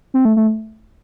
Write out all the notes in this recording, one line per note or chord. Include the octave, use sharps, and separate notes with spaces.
C4
A3
A3